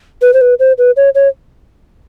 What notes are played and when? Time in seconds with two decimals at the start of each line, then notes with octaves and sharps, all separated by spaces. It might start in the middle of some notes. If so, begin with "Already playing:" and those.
0.22 B4
0.34 C5
0.41 B4
0.59 C5
0.78 B4
0.96 C#5
1.15 C#5